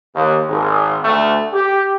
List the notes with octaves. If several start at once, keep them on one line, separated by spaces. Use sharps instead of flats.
D#2
G#1
D2 A3
G4